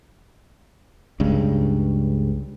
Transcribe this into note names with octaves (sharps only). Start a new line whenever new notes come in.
C#2 G2 C#3